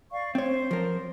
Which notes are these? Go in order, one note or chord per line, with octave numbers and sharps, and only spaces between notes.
D5 F5 C#6
C4 C5 C#5
F3 A#4